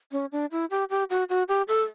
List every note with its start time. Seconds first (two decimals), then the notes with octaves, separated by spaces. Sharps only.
0.12 C#4
0.32 D4
0.52 E4
0.71 G4
0.90 G4
1.10 F#4
1.29 F#4
1.49 G4
1.68 A4